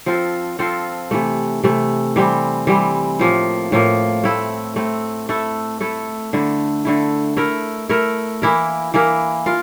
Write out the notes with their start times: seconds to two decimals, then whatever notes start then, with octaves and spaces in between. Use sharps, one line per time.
0.06 F3 C4 F4 A4
0.59 F3 C4 F4 A4
1.11 C3 E3 A3
1.63 C3 E3 A3
2.16 E3 G3 C4
2.67 E3 G3 C4
3.19 A2 F3 A#3
3.72 A2 F3 A#3
4.24 A3 C4 E4
4.76 A3 C4 E4
5.29 A3 E4 A4
5.80 A3 E4 A4
6.33 D3 A3 E4
6.85 D3 A3 E4
7.37 A3 E4 A#4
7.89 A3 E4 A#4
8.42 E3 A#3 E4 A#4
8.94 E3 A#3 E4 A#4
9.46 F4 A#4